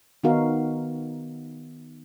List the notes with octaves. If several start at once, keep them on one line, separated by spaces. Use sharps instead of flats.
D#3 B3 D#4 F#4 A#4 F5